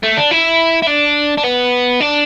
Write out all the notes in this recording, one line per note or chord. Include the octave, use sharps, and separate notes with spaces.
A3
D4
E4
E4
D4
D4
B3
D4